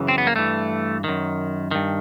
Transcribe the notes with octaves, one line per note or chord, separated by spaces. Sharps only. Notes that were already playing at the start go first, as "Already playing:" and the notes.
Already playing: F#2 C#3 E3
C4
B3
A#3
G2 E3 A3
F#2 D#3
G2 D#3